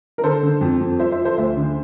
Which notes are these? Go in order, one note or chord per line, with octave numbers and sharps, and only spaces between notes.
A#4
D3 A4 C5
D3
F2
F2
F3 C5 E5
C5 E5
F3
A4 C5
D2 C5 E5
D3